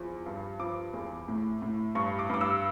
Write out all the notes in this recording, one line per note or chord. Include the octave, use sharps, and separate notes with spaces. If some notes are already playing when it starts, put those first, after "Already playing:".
Already playing: E2 F3
G2
F3 D6
E2
A2
A2
G2 C#6
D6
G2 D6
E6